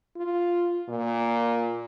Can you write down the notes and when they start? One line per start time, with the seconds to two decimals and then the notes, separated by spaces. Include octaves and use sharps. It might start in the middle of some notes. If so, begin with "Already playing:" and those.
0.16 F4
0.89 A#2